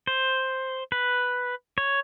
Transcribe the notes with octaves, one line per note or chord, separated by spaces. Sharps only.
C5
B4
C#5